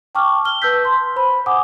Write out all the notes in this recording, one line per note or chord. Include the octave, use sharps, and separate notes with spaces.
G5 A5 C#6 D6 F6
F6 G7
B4 A5 E6 G6 B6
C6
C5 B5
F#5 G#5 D6 D#6